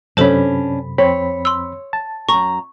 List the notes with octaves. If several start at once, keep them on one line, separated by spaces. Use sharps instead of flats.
F#2 C3 C#4 D4 A4 C5 A5 B5
F2 C4 C#5 B5
C6 E6
A5
F#2 A#5 C#6